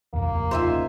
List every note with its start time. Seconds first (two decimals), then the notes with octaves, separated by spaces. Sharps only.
0.13 F1 A#1 D#2 A#3
0.51 C#3 D#4 F4 C5 E5 G#5